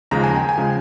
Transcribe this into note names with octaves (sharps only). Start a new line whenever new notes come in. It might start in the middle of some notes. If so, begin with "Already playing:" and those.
D#2 C#3 F3 G#3 A#5
G#5
G5
G#5
C#3 F3 G#3